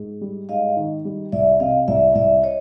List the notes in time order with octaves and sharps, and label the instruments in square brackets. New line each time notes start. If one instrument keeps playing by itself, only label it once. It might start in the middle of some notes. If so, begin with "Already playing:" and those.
Already playing: [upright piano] G#2
G3
[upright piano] G#2 [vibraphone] D#5 F5
[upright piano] D#3
G3
[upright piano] C2 [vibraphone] D5 E5
[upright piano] C3 [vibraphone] D#5 F5
[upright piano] C2 [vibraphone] D5 E5
[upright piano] C2 [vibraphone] D5 E5
[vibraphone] C#5 D#5